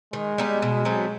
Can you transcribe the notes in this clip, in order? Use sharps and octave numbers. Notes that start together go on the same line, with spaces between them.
D#3 G#3
G3 B3 D#4
B2
F#3 A3 C4